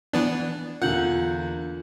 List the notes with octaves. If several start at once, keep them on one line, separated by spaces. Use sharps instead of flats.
E3 B3 D4
E2 D3 A#3 F4 F#5 G6 F#7